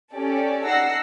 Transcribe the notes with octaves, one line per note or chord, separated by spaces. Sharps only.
C#4 G4 A4 D5
D#4 F#5 E6 A#6 C7